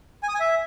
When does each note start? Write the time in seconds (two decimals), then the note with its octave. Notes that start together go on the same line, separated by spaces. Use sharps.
0.23 G#5
0.29 D#6
0.35 G#5
0.40 E5